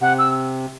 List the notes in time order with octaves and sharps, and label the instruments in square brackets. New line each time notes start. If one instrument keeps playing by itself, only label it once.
[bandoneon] C3 [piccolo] F#5
[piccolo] E6